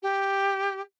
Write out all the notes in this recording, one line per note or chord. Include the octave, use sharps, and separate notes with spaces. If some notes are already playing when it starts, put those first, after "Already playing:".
G4